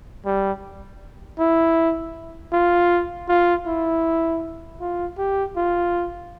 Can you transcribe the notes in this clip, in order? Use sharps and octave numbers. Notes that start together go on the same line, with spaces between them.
G3
E4
F4
F4
E4
F4
G4
F4